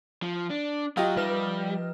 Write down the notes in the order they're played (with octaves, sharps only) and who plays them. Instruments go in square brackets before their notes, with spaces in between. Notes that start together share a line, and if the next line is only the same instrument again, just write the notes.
[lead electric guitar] F3
D4
[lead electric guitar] F#3 [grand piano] F4 G4 D#5
[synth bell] F3 B4 F6 [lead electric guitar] G3